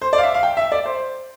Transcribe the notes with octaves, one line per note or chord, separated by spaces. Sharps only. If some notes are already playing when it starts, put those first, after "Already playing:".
C5
D5
F5
E5
F5
G5
E5
D5
C5